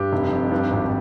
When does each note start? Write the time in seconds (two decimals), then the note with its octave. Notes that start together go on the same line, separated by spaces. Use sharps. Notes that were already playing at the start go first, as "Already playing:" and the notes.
Already playing: G2 G4
0.13 F1
0.32 F2
0.52 G2
0.71 G#1